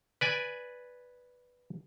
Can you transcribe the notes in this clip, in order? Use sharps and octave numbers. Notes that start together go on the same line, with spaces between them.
B4 D5 G#5